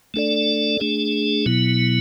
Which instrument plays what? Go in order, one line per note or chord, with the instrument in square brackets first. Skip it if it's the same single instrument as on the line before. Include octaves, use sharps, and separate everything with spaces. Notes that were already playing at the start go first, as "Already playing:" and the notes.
[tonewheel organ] A3 D4 A4 D5
A3 D4 G#4
B2 F#3 B3 E4